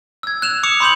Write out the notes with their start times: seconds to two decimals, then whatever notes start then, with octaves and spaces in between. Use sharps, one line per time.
0.23 E6 G#6
0.42 F#6 E7 F7
0.63 D6 D#6 C#7 F7
0.80 B5 C6 D#6 G6 E7 F#7